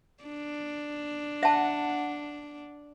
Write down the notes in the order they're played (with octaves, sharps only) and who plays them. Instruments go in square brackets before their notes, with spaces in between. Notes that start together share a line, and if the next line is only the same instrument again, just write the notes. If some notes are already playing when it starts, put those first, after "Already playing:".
[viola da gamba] D4
[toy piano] E5 A5 [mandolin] F#5